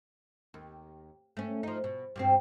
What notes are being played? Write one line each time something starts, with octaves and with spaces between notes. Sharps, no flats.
D#2
A3 C#4
F3 D#4
B2
G2 B2 C4